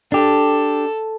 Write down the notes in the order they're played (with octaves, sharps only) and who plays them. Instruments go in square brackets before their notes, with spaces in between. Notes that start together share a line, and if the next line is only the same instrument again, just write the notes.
[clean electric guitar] D4 G4 [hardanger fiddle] A4